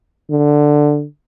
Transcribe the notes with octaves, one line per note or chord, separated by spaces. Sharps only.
D3